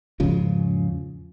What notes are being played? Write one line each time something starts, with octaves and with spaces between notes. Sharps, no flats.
E2 G#2 C#3 F3